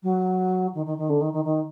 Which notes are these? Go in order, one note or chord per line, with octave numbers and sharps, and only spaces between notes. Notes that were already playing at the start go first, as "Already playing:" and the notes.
F#3
D#3
D#3
D#3
D3
D#3
D#3
D#3